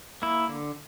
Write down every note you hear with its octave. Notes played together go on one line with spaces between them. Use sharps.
A#3 E4
D3